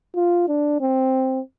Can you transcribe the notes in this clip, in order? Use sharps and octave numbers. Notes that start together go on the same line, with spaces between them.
F4
D4
C4